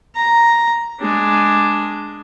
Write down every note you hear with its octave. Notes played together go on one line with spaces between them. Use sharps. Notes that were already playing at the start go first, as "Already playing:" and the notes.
A#5
G#3 D4